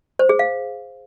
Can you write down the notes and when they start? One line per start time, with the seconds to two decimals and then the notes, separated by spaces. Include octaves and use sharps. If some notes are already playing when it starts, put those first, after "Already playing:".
0.19 C5
0.29 G#4
0.39 F5